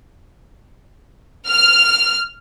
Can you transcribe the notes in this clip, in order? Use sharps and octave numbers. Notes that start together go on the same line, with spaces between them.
F6